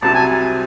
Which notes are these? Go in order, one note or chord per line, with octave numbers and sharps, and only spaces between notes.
C2 C3 F#3 A5
G#5